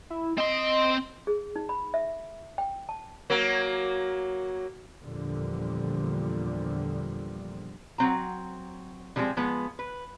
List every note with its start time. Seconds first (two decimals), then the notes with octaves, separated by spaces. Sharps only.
0.10 E4
0.38 C4 D#5 C6
1.27 G#4
1.56 D#4
1.69 B5
1.94 E5
2.58 G5
2.89 A5
3.30 F#3 A#3
5.04 E2 A#2 D3 F3 G3
7.98 F#3 C4 A#5
9.16 D3 F3 G3 G#3 C4
9.37 F3 G#3 B3
9.79 B4